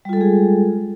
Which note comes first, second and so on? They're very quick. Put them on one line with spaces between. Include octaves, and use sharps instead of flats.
G3 F4 A4 G#3 G#4